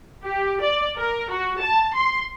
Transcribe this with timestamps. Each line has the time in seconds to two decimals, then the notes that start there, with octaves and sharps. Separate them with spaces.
0.23 G4
0.61 D5
0.97 A#4
1.30 F#4
1.61 A5
1.93 C6